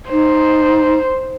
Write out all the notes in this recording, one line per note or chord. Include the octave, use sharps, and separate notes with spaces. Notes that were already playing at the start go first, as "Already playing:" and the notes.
D#4 C5